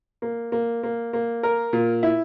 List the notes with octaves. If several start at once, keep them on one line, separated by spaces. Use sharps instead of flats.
A#3
A#3
A#3
A#3
A#4
A#2
E4